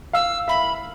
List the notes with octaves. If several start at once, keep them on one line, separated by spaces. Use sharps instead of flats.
F5 E6
E5 B5